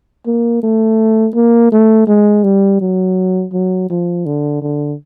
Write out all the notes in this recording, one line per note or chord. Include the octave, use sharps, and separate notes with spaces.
A#3
A3
A#3
A3
G#3
G3
F#3
F#3
F3
D3
D3